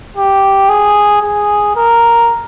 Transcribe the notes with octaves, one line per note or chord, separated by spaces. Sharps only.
G4
G#4
G#4
A#4